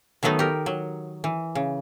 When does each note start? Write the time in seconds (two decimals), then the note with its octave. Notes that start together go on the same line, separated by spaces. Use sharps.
0.23 D#3 F#3 A3 B3 D#4
0.39 G4 A#4
0.66 F#3
1.24 E3
1.55 C#3